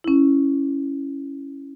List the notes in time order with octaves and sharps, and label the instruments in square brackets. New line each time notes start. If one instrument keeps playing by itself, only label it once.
[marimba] C#4 E4